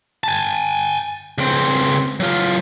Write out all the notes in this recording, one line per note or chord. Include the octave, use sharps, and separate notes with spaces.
G#5 A5
C#2 C4
F#3 F4